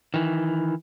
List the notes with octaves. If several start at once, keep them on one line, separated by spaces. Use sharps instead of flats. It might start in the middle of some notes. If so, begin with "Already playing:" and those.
D#3 E3